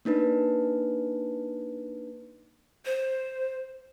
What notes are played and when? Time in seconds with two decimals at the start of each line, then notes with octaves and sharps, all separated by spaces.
0.05 A#3 D4 D#4 B4
2.85 C5